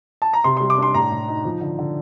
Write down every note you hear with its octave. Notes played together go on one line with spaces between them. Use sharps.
A5
A#5
C3 C6
G3 C6
D6
D4 C6
A2 A#5
A2
D#4
F3
D3
D3